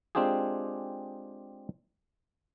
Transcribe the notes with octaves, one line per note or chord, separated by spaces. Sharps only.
G#3 C4 D4 F4 G4 G#4